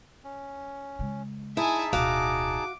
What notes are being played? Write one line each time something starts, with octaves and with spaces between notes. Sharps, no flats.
C#4
C#3 G#3
D#4 E4 G#4 E5 G#5 A5
D1 B2 F#4 F5 D6